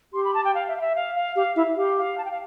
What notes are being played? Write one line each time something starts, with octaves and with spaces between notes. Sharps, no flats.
G4 C6
B5
A5
G5
F5
E5
F5
E5
F5
F5
G4 F5
E4 E5
G4 F5
F5
A5
G5
F5